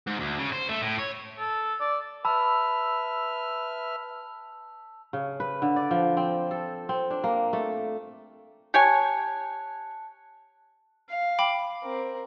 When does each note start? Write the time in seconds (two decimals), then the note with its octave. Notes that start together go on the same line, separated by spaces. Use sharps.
0.07 G#2
0.20 D2
0.39 C#3
0.52 C5
0.69 A3
0.82 A2
0.99 C#5
1.39 A4
1.80 D5
2.25 B4 E5 A5 B5 E6 F6
5.13 C#3
5.40 B4
5.62 D3
5.76 D5
5.91 F3
6.17 C4
6.51 A4
6.89 C4
7.10 D4
7.24 A#3
7.53 A3
8.74 G4 C#5 G#5 A5 F#6 C#7
11.09 F5
11.39 G5 B5 D6
11.82 C4 A#4